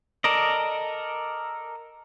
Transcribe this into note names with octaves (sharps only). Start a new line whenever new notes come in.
A4 A#4 D5 D#5